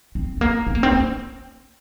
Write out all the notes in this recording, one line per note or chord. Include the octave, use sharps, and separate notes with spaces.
C4
A3
A#3
C4
A#3
C4
A#3